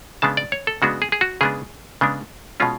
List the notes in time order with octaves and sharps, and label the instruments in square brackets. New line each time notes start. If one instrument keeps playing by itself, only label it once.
[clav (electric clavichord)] C#3 G#3 B3 D4 A5
D5
C#5
A4
C#3 G#3 B3 D4 F#4
G#4
G#4
F#4
C#3 G#3 B3 D4 G#4
C#3 G#3 B3 D4
B2 G#3 C#4 F4